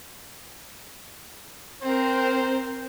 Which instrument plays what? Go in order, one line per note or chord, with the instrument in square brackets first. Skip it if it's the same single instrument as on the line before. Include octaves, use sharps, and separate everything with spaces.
[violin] C4 A#4 [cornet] C5